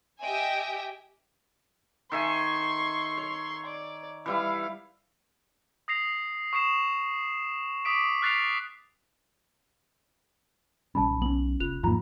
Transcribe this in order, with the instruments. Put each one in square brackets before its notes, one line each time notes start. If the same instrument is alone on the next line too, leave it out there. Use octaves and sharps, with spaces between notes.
[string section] G4 D#5 E5 G5 G#5
[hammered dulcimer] D#3 E5 G#5 [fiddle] C6 C#6
[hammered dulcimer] C#5
[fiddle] D5
[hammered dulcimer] E3 G3 E4 [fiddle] F5
[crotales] D#6 A#6 C7 F7
C#6 D#6 C7 E7
D6 D#6 B6 D7
F6 F#6 A6 B6 C7 F7
[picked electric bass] A#1 G3 C#4 [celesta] A5 B5
[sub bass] B1
[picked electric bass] B3 C#4 [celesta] F#7
[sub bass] F1 [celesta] F4 F#6 F7
[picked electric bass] E2 F3 A#3 [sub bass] G#2 [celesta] F4 A#5